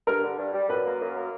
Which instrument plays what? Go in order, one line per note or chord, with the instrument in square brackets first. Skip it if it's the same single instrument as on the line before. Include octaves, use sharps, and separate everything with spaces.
[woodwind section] G2 [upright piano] A#4
[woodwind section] D3
G2
G3
[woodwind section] F#2 [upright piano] B4
[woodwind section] A#3
F#2
A#3